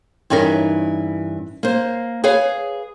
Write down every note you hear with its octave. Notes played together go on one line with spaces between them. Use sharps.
G2 E3 C#4 D#4 A#4
A#3 C5
G#4 B4 C#5 F5